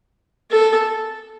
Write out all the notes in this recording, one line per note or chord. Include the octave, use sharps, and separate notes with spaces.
A4